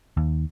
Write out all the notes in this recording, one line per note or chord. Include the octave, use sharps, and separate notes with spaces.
D#2